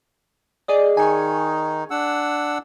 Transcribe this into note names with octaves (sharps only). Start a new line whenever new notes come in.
G#4 D5 D#5
D#3 D#4 G#5 C#6
D4 F#5 E6